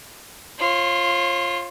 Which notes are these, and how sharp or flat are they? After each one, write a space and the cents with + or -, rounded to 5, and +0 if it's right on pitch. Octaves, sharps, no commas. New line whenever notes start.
F4 +0 C#5 -40